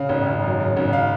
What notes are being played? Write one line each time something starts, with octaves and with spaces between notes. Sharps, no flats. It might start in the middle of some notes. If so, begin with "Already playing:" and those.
Already playing: C#3 F5
G#1
G#1
F#2
C#3
G#1
F5